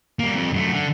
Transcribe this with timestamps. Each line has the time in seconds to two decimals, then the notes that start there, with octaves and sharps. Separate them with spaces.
0.19 G3 A#3
0.34 F2
0.53 F#2 A3
0.72 D3